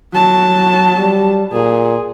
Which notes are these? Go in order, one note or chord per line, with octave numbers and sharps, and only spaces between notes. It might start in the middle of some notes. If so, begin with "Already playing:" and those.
F#3 A5
G3
A#2 G#4